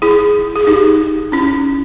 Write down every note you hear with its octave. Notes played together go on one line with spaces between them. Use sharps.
E4 G#4
G#4
D#4 G4
C#4 E4